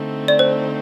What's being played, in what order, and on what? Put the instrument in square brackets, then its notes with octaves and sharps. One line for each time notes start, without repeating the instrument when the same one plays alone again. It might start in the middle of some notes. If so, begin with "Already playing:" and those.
Already playing: [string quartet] D3 A3 C4 D#4
[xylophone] D5
C5